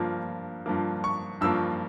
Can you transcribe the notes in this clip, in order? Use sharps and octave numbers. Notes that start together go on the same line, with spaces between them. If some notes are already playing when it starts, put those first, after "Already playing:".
Already playing: G2 F3 A#3
G2 F3 A#3
C#6
G2 F3 A#3 E6